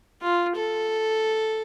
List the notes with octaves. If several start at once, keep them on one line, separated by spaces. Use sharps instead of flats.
F4
A4